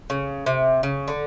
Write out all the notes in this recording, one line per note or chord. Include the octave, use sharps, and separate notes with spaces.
C#3
C3
C#3
D3